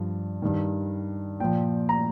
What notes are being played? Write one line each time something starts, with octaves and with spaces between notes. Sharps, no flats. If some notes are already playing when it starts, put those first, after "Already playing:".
Already playing: G2 F3
G2 D#3
A#2 F3 G5
A#5